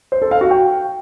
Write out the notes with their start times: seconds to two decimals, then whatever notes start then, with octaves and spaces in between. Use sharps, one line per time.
0.12 C5
0.22 A4
0.31 F5
0.41 F#4
0.51 G5